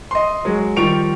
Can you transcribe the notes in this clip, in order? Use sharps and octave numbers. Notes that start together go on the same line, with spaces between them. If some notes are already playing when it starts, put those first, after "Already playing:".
D#5 C6
F#3 G#3
D#3 F3 G3 C#6 D7 F7